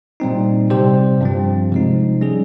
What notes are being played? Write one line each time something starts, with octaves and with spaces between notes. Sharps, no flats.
A#2 G3 C4 D#4
C3 G3 C4 G4 C5
G2 F3 C4
C3 F3 G#3 D#4
G3 C#4 G#4